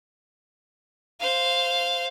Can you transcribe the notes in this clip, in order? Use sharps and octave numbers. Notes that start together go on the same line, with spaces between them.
C5 F5